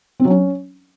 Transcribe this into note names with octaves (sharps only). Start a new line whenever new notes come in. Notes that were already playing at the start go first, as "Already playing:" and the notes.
C4
F#3
C#4